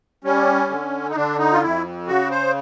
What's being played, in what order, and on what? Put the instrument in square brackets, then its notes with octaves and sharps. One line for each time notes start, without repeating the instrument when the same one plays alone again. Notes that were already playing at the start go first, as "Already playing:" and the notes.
[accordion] G3 C#4
D3
D#4
D3 D4
D#4
F4
F2 E4
C#3 F#4
C5